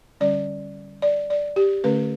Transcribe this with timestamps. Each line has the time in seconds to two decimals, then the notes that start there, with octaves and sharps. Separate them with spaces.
0.21 D3 G3 C#4 D5
1.02 D5
1.30 D5
1.56 G4
1.84 D3 A3 C#4 B4